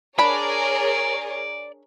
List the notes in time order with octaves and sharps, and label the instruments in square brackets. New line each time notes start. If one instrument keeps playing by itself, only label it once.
[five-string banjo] D4 B5 [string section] G#4 A#4 C#5 [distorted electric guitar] D5